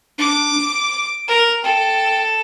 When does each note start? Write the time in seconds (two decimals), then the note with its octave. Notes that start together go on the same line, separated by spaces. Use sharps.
0.18 D4 D6
0.56 D7
1.28 A#4
1.63 A4 G5